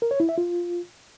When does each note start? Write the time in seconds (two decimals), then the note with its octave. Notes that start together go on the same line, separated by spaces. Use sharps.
0.02 A#4
0.11 C#5
0.20 E4
0.29 E5
0.38 F4